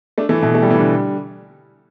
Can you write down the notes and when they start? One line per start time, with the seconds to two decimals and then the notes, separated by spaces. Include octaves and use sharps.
0.18 A3 D4
0.29 E3 A3
0.42 B2 E3
0.55 A3
0.62 G3
0.70 E3
0.78 D3 G3